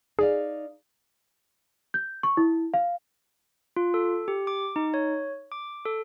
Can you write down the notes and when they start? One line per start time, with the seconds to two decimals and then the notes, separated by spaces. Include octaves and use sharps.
0.19 D#4 G#4 D5 F5
1.94 G6
2.23 C#6
2.37 E4
2.74 F5
3.76 F4
3.94 A4
4.28 G4
4.47 D6
4.76 D#4
4.94 C#5
5.52 D6
5.86 A4